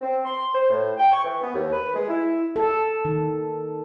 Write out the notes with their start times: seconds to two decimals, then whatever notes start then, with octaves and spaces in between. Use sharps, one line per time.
0.02 C4
0.25 C6
0.54 C5
0.69 A2
0.98 G5
1.12 C#6
1.24 E3
1.42 B3
1.54 D#2
1.72 B4
1.94 G#3
2.08 E4
2.56 A4
3.05 D#3